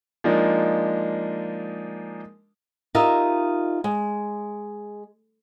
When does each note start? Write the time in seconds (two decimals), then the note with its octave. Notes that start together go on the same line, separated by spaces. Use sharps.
0.24 F3 G#3 A#3 D4 D#4
2.95 D#4 F4 G4 A#4 D#5 E5
3.84 G#3